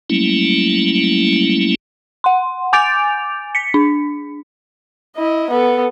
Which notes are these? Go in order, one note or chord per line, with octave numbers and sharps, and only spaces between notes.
F#3 G3 A3 A#3 C#4 E4
F#5 C6
G#5 D6 G6 A6 D7 F7
B6 C#7
D4
E4 D#5
B3 A4